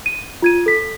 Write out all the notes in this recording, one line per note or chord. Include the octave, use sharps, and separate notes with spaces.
D#7
F4 G#6 D#7
A4 B6